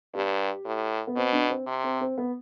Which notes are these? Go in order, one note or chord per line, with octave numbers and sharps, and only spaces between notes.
G2 G4
A2
B3
B2 C4
D4
C4
C3
C4
C4
B3